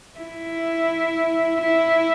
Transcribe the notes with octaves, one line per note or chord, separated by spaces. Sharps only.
E4
E4